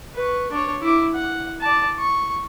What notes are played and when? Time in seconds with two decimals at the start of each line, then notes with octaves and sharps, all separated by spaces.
0.15 B4 C#6
0.51 D4 C#5
0.82 E4 D6
1.15 F#5
1.61 D5 A5
1.99 C#6